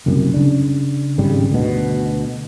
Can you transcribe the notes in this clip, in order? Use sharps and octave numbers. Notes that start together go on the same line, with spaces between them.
F#1 C2 F#2
C#3 D4
G#1 G#2 C#3 G3
D2 B2